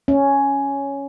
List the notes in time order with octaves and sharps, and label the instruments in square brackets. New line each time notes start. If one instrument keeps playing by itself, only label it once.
[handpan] C#4